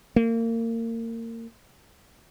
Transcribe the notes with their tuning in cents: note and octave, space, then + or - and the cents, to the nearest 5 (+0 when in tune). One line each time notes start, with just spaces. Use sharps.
A#3 -30